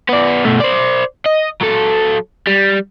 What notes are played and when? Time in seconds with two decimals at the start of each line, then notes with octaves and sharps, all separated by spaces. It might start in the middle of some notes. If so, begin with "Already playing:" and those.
0.09 B3 D5
0.45 B2 A3
0.60 C5 D5
1.26 D#5
1.62 F#3 A4
2.47 G3